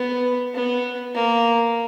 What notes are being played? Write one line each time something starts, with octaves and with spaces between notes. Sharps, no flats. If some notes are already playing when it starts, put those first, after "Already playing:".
Already playing: B3
B3
A#3